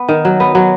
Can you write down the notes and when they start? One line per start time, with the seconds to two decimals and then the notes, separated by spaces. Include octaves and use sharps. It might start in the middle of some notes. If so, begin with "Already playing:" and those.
Already playing: B3
0.08 D#3
0.25 F#3
0.40 B3
0.55 F#3